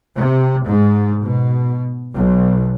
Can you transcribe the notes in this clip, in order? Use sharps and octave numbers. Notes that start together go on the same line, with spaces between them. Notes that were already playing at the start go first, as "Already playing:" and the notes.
C3
G#2
B2
B1